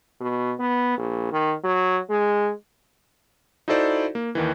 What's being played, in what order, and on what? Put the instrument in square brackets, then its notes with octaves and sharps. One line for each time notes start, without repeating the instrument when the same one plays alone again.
[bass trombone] B2
B3
A#1
D#3
F#3
G#3
[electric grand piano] D#4 E4 F#4 A4 C5 D5
A#3
D#2 D#3 E3